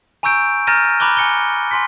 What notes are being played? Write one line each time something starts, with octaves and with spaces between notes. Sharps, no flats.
G#5 A#5 C#6 E6 G6 D7
A#5 F6 G6 A6 A#6 D#7
A#5 B5 D6 F#6 G7
G#5 C#7 G7
G#5 C6 B6